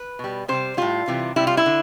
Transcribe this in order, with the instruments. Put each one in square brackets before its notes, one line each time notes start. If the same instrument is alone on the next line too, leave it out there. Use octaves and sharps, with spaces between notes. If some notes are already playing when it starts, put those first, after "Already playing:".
Already playing: [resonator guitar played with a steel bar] B4
B2 G3
C3 G3 C5
A2 G3 F4
C3 E3 G3
C3 G3 E4
F4
E4
D3